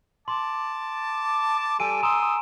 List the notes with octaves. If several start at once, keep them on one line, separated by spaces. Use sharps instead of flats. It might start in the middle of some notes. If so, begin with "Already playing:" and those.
A5 C6 D6
G3 A4 G#5 D7 D#7
A#5 C6 D#6 E6